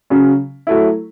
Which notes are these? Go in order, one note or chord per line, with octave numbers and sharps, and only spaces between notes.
C#3 F#3 C#4
F#3 A3 E4